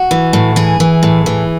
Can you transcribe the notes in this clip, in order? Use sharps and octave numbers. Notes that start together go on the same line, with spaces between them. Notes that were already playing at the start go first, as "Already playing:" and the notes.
Already playing: F#4
E3
A2
E3 G#4
E3
A2
E3